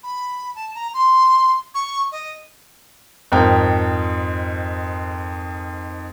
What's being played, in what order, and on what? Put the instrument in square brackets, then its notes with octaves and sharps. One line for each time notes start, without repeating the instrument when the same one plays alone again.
[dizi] B5
A5
A#5
C6
C#6
D#5
[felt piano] F2 G#2 A#4 G5